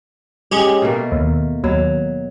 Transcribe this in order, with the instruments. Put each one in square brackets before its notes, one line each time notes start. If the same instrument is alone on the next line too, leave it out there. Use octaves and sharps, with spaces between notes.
[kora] G#3 [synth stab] C#4 G4 G#4
[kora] B2 A3 A#3
[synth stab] D#2
[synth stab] D#2 [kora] F#3